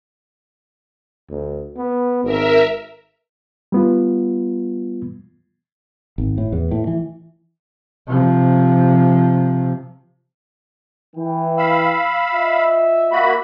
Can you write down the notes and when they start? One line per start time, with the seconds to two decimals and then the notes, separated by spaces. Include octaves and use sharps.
1.30 D2
1.77 B3
2.24 G#1 A#4 E5
3.72 G3 B3 F4
6.18 G#1
6.38 A2
6.52 E2
6.71 A2
6.87 E3
8.07 C3 F3
11.16 E3 G5
11.58 F5 B5 E6
12.32 F4 D#5 E5
13.12 A#3 F#4 B5